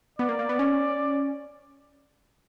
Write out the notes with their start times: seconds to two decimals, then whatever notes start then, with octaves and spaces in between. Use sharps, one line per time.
0.19 B3 D5
0.29 A#3
0.39 A#3
0.49 B3
0.59 C#4